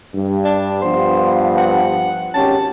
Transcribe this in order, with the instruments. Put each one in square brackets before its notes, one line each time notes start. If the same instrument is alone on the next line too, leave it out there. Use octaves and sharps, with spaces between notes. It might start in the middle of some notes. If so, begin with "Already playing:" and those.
[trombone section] G2
[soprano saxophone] D4
[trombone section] G2 F3 B3 [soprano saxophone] C5
[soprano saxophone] F#5
[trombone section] G#1 C#4 G4 [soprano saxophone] A5